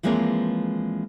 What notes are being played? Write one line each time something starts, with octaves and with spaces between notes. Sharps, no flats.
E3 F3 G#3 A#3 C4 C#5